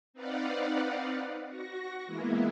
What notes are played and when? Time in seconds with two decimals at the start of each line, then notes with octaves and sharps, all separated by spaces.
0.14 C4 D#4 B4 D5 F5 F#5
1.48 F#4 C#6 A#6
2.07 E3 G#3 A#3 B3 E4